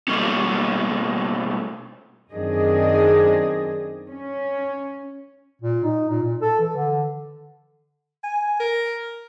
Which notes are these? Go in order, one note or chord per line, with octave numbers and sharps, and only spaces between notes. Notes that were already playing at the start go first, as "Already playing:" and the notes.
B2 G3 A3 A#3 C#4
F#2 D#3 C4 D4 G#4 D#5
C#4
A#2
D#4
A#2
A#2
A4
E3
D3
G#5
A#4